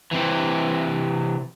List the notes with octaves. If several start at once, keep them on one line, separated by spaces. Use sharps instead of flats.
C3 E3